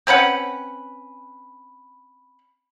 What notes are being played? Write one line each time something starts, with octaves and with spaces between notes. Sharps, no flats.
C4 C#4 B4 F#5